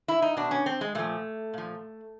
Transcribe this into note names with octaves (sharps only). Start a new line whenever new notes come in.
E4
D#4
B2 D4
C#4
C4
G#3
A#2 F3 A3
A#2 F3